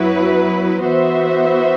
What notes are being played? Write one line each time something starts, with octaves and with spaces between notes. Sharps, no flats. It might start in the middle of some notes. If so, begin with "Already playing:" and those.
Already playing: F#2 F#3 B3 E4 B4
E3 B3 F#4 C5 E5